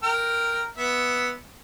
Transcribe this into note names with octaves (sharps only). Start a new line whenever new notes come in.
A#4 G5 F6
B3 E5